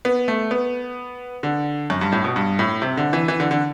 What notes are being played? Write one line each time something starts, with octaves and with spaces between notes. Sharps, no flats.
B3
A3
B3
D3
F#2
G2
A2
B2
G2
A2
C3
D3
E3
E3
D3
D3